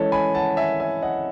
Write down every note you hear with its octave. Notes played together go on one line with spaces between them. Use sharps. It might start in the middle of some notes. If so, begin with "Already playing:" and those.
Already playing: E3 G#3 C#4 A4 C#5
G#5 B5
F#5 A5
E5 G#5
E5 G#5
D#5 F#5